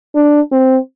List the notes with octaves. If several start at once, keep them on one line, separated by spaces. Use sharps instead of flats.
D4
C4